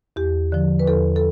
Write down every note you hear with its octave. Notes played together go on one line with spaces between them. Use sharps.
E2 G4
D3 F3
B4
E2 A4
A4